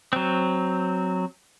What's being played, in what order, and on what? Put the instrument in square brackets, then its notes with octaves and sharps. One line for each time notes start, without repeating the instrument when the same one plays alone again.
[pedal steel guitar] F#3 C4